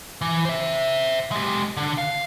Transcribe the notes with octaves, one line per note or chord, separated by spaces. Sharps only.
E3
C5 E5
G#3 G4
D3 D4
F5